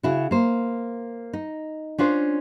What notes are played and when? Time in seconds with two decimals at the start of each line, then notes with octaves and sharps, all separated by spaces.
0.03 C#3 E4 F#4
0.31 A#3 C5
1.33 D#4
1.98 C#4 D4 F4 C5